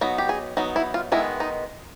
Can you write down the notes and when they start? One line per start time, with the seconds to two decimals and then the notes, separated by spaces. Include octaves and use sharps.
0.01 F#3 B3 D#4
0.18 G4
0.29 G#4
0.57 F#3 B3 D#4
0.76 E4
0.94 F4
1.12 D#3 G#3 B3 E4
1.40 D#4